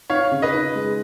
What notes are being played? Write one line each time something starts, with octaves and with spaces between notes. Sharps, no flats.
D#4 C#5 F5
C#3
B4 D#5
D#4
G#3